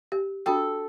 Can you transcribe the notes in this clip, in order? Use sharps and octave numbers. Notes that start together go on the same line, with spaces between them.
G4
D4 F#4 A4 G5